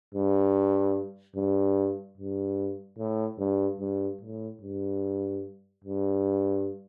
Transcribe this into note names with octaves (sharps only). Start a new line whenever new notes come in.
G2
G2
G2
A2
G2
G2
A2
G2
G2